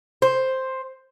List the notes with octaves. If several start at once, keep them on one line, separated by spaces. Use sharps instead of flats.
C5